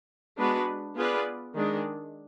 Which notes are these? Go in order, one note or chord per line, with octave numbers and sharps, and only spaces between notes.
G#3 B3 D4 F#4 B4
B3 F4 G#4 B4 D5
D#3 G#3 D4 G#4